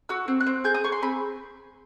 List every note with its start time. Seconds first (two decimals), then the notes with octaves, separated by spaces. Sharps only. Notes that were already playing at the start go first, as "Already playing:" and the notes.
0.09 F#4 E6
0.28 C4
0.40 F#6
0.46 C4
0.64 G#4 G6
0.74 D#6
0.84 G#4 C#6
0.92 C6
1.02 C4 B5